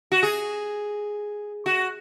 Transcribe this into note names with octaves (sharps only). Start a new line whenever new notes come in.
F#4
G#4
F#4